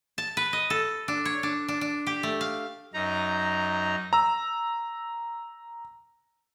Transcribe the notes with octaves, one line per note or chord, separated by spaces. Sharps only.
A5
B4
D#5
A4
D4
C#5
D4
D4
D4
G4
A3
F5
F#2 D#4 A#5
A#5 E6